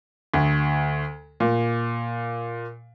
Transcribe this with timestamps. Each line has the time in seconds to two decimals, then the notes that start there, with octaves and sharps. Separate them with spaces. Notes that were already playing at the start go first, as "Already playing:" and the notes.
0.34 D2
1.40 A#2